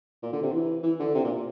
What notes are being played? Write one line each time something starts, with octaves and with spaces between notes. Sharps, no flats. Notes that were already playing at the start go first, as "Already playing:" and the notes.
A#2
D3
C3
E3
E3
D3
C3
A#2